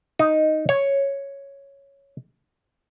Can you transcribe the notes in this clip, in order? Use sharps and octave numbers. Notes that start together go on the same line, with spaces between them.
D#4
C#5